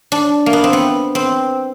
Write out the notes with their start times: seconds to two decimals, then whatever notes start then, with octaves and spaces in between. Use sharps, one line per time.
0.12 D4
0.46 A#3
0.53 B3
0.64 C4
0.73 B3
1.15 C4